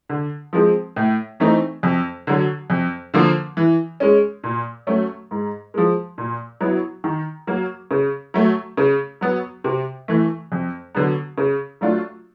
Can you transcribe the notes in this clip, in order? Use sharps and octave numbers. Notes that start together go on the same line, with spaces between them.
D3
F3 G#3 C4
A2
E3 A3 C4 D#4
F2
D3 F#3
F2
D3 F3 A#3
E3
G#3 C#4
A#2
F#3 A3 C#4
G#2
F3 G#3
A#2
F#3 B3 E4
D#3
F#3 A#3
C#3
F#3 A3
C#3
F#3 B3
C3
E3 A3
F2
D3 F#3 B3
C#3
F#3 A3 D4 F4